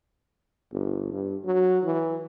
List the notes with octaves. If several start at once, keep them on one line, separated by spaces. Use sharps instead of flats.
G1
G2
F#3
E3